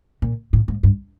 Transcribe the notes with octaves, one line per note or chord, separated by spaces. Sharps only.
A#2
A2
G#2
G2